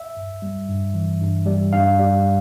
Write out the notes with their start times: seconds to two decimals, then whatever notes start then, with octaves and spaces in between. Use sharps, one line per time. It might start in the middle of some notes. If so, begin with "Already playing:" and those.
Already playing: E5
0.17 G2
0.42 G3
0.69 G2
0.94 E3
1.21 G2
1.46 G3
1.73 G2 F5
1.99 G3